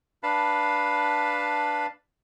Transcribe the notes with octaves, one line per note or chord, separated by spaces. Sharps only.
D4 B4 F5 A5 B5